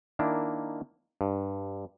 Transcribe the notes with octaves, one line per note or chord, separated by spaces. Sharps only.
D#3 A#3 D4 E4
G2